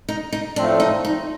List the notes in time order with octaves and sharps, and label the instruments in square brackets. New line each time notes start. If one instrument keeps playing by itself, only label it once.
[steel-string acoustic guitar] D#4
D#4
[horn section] A2 F3 A3 C4 [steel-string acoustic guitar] D4
[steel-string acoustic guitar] D#4
D#4